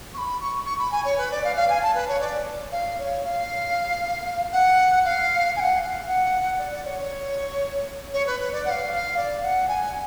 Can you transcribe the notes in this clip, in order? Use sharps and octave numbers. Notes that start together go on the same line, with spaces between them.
C#6
B5
C#6
C#6
B5
G#5
C#5
B4
D5
F5
F5
G#5
A5
B4
C#5
D5
F5
C#5
F5
F#5
F5
G#5
F#5
F5
F5
F#5
D5
D5
C#5
C#5
C#5
B4
B4
D5
F#5
F5
F5
D5
F#5
G#5